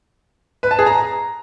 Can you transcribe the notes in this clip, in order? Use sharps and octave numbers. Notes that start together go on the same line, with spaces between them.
B4
A5
G#4
A#5